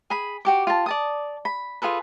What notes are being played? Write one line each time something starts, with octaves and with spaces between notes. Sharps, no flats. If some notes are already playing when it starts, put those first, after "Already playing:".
G#4 B5
F#4 G4 D6
F4 A5
D5 A5 D#6
B5
F4 G#4 A4 B4